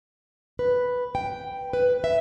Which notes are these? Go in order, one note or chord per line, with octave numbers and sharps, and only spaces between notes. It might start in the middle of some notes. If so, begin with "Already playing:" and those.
B4
G5
B4
E5